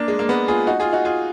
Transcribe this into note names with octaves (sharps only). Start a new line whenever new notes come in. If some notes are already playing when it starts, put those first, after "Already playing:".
Already playing: A#3 D4
G#3
A#3
G#3 B3
F4 G#4
D#4 F#4
F4 G#4
D#4 F#4
F4 G#4